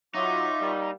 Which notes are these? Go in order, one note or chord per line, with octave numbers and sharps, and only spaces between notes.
F#3 D#4 F4 E5 C#6 D6
G3 A#3